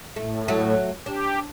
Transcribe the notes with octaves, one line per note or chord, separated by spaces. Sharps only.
A2 A3
F#3 A3
D4 G4